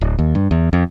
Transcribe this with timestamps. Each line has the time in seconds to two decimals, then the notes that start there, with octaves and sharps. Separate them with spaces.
0.01 D1
0.19 D#2
0.35 G2
0.51 E2
0.73 F2